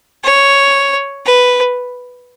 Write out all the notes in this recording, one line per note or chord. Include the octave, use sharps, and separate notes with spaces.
C#5
B4